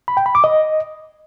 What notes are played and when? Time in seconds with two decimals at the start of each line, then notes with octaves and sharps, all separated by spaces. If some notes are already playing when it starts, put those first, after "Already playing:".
0.08 B5
0.17 G5
0.26 B5
0.35 D6
0.44 D#5